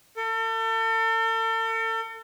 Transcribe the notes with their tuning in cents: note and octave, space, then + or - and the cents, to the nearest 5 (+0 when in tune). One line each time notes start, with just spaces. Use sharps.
A4 +40